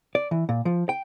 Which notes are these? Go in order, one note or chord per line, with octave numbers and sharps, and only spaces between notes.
D5
E3
A#2
F3
G5